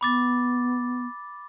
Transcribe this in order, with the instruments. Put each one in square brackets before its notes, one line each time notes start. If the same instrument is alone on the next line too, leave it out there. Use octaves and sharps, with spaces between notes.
[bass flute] B3 [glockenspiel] B5 D6 A6